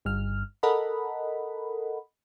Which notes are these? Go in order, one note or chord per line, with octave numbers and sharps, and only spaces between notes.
G1 G2 F6
A4 A#4 D#5 F#5 B5